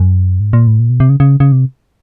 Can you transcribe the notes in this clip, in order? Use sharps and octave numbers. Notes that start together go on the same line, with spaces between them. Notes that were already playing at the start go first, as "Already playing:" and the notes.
Already playing: F#2
G#2
A#2
A2
A#2
B2
C3
C#3
C#3
C#3
C3